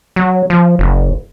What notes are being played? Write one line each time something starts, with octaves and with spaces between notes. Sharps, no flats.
F#3
F3
F#1